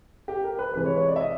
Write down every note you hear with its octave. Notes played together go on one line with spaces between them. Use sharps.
G4
A#4
B4
C3 E3 G#3 B4
C#5
C#5
D5
E5
D#5